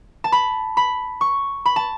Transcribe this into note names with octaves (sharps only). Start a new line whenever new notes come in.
A5
B5
B5
C#6
B5
A5